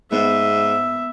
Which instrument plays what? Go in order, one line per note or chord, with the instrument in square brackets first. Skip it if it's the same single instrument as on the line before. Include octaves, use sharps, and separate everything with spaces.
[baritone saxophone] G#2 [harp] B3 [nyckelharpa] E5